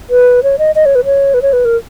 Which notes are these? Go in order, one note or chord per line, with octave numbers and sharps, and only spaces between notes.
B4
C#5
D#5
D#5
C#5
B4
C#5
B4
C#5
B4
A#4